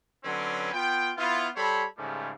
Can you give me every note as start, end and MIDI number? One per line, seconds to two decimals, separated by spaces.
0.24 0.70 50
0.24 0.70 54
0.24 0.70 60
0.24 0.70 61
0.24 0.70 71
0.73 1.11 59
0.73 1.11 65
0.73 1.11 79
1.17 1.48 59
1.17 1.48 64
1.17 1.48 65
1.56 1.84 55
1.56 1.84 69
1.56 1.84 72
1.56 1.84 73
1.56 1.84 83
1.98 2.31 44
1.98 2.31 49
1.98 2.31 53
1.98 2.31 55
1.98 2.31 57